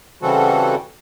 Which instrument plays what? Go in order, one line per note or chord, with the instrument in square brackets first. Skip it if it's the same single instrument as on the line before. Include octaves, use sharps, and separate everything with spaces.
[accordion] C#3 E3 G3 C4 F#4 A4